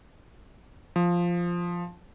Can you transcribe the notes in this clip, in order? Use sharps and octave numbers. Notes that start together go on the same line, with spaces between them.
F3